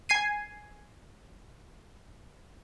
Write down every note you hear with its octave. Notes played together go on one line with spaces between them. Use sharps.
G#5 G#6 C7 D#7